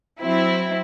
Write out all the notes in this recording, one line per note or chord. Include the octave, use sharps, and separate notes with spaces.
F#3 C4 E4